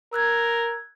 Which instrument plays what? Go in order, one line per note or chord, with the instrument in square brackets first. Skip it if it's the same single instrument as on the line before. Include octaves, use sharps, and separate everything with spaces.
[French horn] A#4 [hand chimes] E6 F#6 G#6